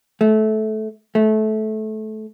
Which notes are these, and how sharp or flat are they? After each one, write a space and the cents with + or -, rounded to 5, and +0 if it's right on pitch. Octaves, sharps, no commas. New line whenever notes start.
A3 -20
A3 -20